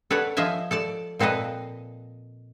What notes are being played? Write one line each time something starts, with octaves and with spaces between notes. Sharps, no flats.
A4 B4 C#5 D5 F#5
F3 C5 D#5 E5 G#5
A4 D5 A5
A#2 C4 A4 B4 D#5